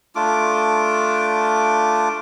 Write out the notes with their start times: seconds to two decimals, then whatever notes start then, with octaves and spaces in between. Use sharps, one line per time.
0.15 A3 D4 F4 D6